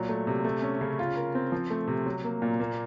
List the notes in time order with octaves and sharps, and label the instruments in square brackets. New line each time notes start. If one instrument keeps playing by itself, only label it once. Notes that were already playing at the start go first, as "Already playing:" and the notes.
Already playing: [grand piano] A#2 F#3
A3
C3
A3
C#4
C#3
F4
A#4
C4
F3
A3
C3
F#3
A#3
A#2
A#3